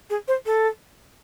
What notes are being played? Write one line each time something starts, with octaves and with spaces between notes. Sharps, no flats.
G#4
C5
A4